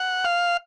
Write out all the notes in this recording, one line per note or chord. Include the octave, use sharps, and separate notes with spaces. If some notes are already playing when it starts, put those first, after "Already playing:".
Already playing: F#5
F5